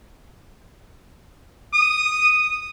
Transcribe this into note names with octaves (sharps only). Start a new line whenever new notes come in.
D#6